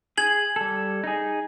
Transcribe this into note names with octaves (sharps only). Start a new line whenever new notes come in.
G#4 G#6 F#7
G3 A4
D#4 G#4